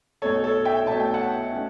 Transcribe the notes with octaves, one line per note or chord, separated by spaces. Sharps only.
B1 B2 A3 A4 C#5
A4 C#5
E5 G5
B1 B2 A3 A5
G5
F#5 A5
A3 C#4